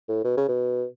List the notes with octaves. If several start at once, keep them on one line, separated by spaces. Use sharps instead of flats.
A2
B2
C#3
B2